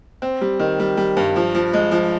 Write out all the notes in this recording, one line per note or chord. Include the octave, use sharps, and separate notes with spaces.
C4
G3
D#3
G3
G3
G2
F3
F3
G#3
F3